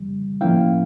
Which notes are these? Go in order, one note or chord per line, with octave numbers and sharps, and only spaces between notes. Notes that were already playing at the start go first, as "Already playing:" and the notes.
Already playing: F2 C#3 E3 G3
A2 F3 A#3 C#4 E4 F5 G5